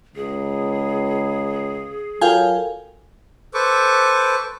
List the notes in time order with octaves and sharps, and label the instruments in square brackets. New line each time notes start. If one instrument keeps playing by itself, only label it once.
[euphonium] C#2 [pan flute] G#4
[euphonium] F#3 [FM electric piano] F4 A4 A#4 [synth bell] F5 G5 G#5
[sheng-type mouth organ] A4 B4 C5 C#6 D6